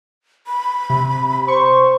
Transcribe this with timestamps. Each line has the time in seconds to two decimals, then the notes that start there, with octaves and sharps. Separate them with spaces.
0.47 B5
0.90 C3
1.48 C5 C#6